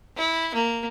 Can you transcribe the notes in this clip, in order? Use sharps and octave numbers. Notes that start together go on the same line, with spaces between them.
E4
A#3